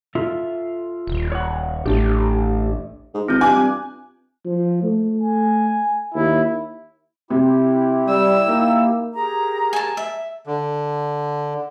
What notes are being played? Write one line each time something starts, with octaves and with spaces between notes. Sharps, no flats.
F4 A4 E5
D#1
C#5 F#5
A1 A3 D4 G4
G#2
G#1 E3 C4 F4 G6
G2 G#5 D6 F#6
F3
A3
G#5
D#2 E4
C3 E4 G4
G3 E6
A#3 D#4
G4 G#4 A#4 A#5
G#5 A5
E5
D3